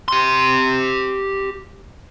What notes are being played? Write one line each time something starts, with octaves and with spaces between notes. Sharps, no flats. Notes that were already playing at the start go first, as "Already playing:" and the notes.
G4 C6